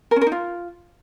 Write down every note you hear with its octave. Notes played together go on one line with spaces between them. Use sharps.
A#4
C#4
A#4
D#4
F4